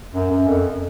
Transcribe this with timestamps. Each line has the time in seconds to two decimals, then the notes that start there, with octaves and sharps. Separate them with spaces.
0.14 F#2
0.31 F#2
0.47 F2